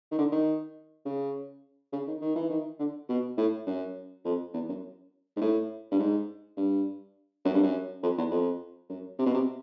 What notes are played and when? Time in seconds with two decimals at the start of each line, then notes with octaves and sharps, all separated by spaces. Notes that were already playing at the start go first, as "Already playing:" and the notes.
0.12 D#3
0.18 D3
0.32 D#3
1.05 C#3
1.93 C#3
2.07 D#3
2.22 D#3
2.35 E3
2.49 D#3
2.79 D3
3.09 B2
3.37 A2
3.66 F#2
4.25 F2
4.54 E2
4.69 F#2
5.37 G#2
5.41 A2
5.91 G2
5.99 G#2
6.57 G2
7.45 F#2
7.54 G2
7.63 F#2
8.03 F2
8.18 E2
8.31 F2
8.89 F#2
9.19 C3
9.26 B2
9.34 C3